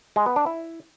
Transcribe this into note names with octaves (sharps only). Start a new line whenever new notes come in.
G#3
B3
D4
E4